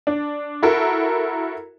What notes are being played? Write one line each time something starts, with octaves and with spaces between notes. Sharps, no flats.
D4
E4 F#4 A4 A#4